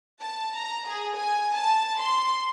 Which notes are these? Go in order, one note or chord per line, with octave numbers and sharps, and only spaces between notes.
A5
A#5
G#4
G#5
A5
C6